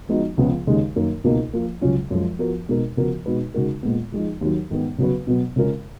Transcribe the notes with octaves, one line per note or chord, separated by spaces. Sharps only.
F3 G#3 B3 D#4 F#4
C#2 C#3 F3 B3
D#2 C#3 G#3 D#4
F#2 D#3 A#3
C#2 B2 A#3 D#4 A#4
F3 A#3 F4
C#2 C#3 F#3 C#4 F4
F#2 F3 G#3
F3 B3 F#4 A#4
B2 G#3 D#4 A#4
C#3 F3 B3 F#4 A#4
B2 G#3 D#4 F#4 B4
C#3 G#3 D#4 F#4 A#4
A#2 G#3 B3
F3 G#3 D#4 G#4
D#2 D#3 F#3
G#2 D#3 G#3 B3
C#3 F#3 B3 F#4 B4
B2 F#3 B3
C#3 G#3 C#4 F4 A#4